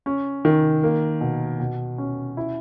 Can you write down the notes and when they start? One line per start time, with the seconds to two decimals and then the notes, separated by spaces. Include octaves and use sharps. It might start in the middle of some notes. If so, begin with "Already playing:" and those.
0.06 C#4
0.45 D#3
0.83 A#3
1.21 B2
1.60 B2
1.98 C#4
2.37 E4